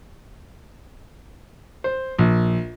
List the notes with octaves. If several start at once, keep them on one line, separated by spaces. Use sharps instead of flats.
C5
A#1